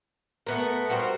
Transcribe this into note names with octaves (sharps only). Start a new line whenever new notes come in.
A3 B3 A#4
G3 F#4 A#4 C5